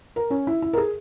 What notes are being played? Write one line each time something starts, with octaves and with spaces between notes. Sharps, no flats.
A#4
C#4
E4
E4
A#4
G#4